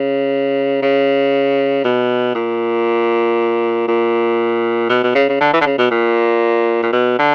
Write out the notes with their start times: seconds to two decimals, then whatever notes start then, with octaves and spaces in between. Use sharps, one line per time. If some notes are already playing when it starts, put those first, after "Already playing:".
Already playing: C#3
0.82 C#3
1.85 B2
2.35 A#2
3.88 A#2
4.90 B2
5.04 B2
5.15 C#3
5.29 C#3
5.41 D3
5.54 E3
5.61 D3
5.66 C#3
5.78 B2
5.91 A#2
6.83 A#2
6.92 B2
7.19 D3